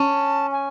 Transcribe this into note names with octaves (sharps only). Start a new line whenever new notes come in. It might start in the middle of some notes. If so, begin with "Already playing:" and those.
Already playing: C#4 A5
G#5